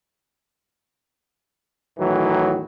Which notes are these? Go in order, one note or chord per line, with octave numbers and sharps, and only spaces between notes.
E2 A2 D#3 E3 F#3